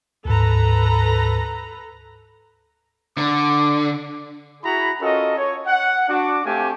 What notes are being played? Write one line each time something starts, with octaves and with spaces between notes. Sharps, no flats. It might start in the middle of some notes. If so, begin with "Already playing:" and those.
D2 G#2 A4 B4 A#5
D3 D6
E4 F#4 G#4 A#5 B5
C#4 F4 F#4 A4 A#4 D#5
C#5
F#5
D4 F#4 D6
A3 C4 G4 F5 G#5 A5